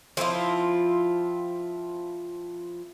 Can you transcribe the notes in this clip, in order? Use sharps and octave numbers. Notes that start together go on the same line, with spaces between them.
F3 C4 E4 F4